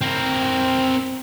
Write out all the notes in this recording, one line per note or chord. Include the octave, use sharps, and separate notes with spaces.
C4 A#4